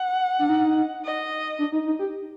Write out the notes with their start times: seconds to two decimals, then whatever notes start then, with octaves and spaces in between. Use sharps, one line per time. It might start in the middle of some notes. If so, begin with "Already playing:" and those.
Already playing: F#5
0.39 D4
0.49 D#4
1.04 D#5
1.59 D4
1.72 D#4
1.86 D#4
1.99 G4